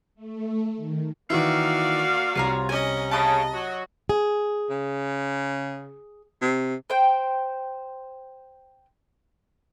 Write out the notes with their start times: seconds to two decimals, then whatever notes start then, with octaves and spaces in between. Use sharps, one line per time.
0.15 A3
0.76 D#3
1.30 D#3 E3 A#3 F#4 D5 E5 F5
2.35 C2 C3 F4 C5 C#5 A#5
2.69 C#4 D#5 G#5
3.11 C#3 D#5 A5 B5
3.53 F#3 F#4
4.09 G#4
4.70 C#3
6.42 C3
6.90 C5 G5